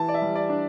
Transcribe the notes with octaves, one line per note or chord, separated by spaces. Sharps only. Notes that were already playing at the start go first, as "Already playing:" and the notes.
Already playing: E3 A5
D5
E5
G3
D5
D4